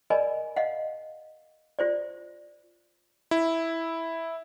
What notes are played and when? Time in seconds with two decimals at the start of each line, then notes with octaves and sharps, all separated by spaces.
0.10 A#4 D5 D#5 G#5 B5
0.56 D#5 F5 F#5
1.79 F4 C5 D5
3.31 E4